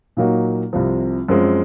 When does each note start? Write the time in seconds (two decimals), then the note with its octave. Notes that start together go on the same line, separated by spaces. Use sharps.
0.17 A#2 F#3 A#3 D#4 F#4
0.73 C2 C3 F3
1.29 F#2 F3 G#3 C4